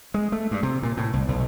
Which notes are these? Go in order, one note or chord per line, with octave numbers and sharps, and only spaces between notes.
G#3
A3
G2
C3
A#2
A2
C2
B1